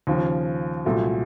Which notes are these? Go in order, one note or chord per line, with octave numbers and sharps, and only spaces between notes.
D#2 C#3 F3
C2 A#2 F#3 A3